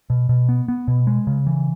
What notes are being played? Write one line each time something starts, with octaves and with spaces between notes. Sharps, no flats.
B2
B2
B3
B3
B2
G#3
C#3
E3